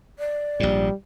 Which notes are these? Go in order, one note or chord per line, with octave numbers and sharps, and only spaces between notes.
D5
A#1 G#2 G3